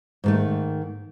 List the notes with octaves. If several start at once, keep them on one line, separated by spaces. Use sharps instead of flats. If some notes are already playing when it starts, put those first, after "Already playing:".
G#2 D#3 A3